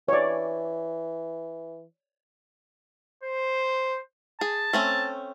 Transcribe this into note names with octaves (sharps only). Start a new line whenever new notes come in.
E3 C#5 D5
C5
G#4 A5
A3 C4 C#4